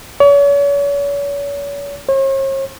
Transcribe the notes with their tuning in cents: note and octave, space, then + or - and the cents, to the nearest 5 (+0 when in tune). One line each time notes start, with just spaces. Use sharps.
C#5 +40
C#5 -45